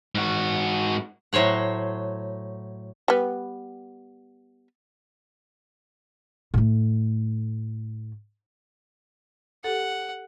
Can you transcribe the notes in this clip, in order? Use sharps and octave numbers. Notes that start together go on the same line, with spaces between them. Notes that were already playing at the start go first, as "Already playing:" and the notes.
G#2 F#4
A2 F#3 C5 C#5 F#5
G3 B3
A2 A3
G4 A4 F#5